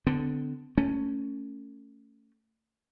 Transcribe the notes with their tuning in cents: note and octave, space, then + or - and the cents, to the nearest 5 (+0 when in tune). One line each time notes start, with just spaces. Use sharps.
D3 +0 B3 +45
A3 +20 C#4 +0